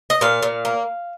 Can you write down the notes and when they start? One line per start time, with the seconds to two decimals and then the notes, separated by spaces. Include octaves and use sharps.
0.10 D#5
0.21 A#2 F5
0.42 A#2
0.65 A#3